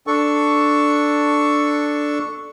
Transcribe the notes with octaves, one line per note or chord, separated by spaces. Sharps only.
D4 A4 C#6